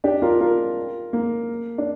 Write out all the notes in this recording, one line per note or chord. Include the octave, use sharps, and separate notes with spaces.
D4 G4
F4 A#4
F4 A#4
A#3
D4